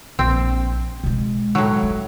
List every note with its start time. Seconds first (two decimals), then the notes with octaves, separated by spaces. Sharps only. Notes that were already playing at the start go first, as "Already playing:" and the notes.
0.19 A#1 C4
1.04 B2 G#3
1.55 A2 F#3
1.83 E4